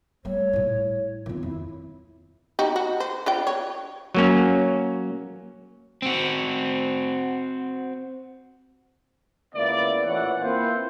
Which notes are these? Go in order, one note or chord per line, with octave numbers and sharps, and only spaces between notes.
G3 A3 C#5
A2 E4
D#3 C4 F4
F2 E4
D#4 F#4 G4
F#4
C5
D4 F4 G5
C#5
F#3 A#3 C#4
C4 F#4
C#2 A#3 B3 E4 D5
A1 A#2 E3 C#5 F#5
A#3 C4 E4 F4 B4 C5